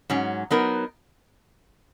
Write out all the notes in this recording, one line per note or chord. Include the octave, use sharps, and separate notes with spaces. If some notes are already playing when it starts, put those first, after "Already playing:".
G#2 F#3 C#4
F#3 B3 D#4 A#4